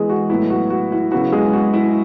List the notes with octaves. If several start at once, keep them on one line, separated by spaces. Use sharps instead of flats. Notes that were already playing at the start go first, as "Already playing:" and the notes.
Already playing: E3 G#3 B3 E4 G#4
F#4
A2 F#3 B3 E4
F#4
F#4
E4
C#3 F#3 B3 E4 F#4
G#3 G#4
F#4
E4